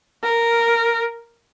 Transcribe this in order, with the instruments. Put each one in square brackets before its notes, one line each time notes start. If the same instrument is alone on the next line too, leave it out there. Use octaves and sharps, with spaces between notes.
[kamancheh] A#4